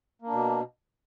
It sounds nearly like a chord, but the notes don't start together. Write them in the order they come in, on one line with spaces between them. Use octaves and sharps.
A#3 D4 B2